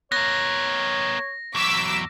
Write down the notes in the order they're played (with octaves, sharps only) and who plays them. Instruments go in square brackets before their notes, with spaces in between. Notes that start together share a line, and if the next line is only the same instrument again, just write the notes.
[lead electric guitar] B3 A#4 [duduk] C#5 [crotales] A#6
[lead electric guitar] E2 F#3 [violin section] D6 E6 B6